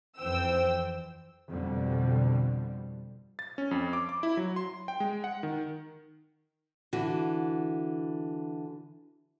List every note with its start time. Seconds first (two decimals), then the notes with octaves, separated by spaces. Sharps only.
0.18 F2 E3 C5 G5 E6
1.48 F2 B2 D3 G3
3.39 A6
3.58 C#4
3.71 F2
3.93 D6
4.09 D6
4.23 E4
4.37 F#3
4.56 C6
4.88 G5
5.00 G#3
5.24 F#5
5.43 D#3
6.93 D3 E3 F#4